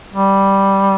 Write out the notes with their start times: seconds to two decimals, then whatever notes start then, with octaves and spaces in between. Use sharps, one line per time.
0.13 G3